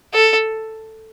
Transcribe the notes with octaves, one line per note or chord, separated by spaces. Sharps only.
A4